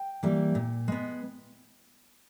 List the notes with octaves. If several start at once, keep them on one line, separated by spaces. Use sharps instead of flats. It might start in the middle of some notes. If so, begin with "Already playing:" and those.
Already playing: G5
E3 G3 A#3
A#2
G#3 B3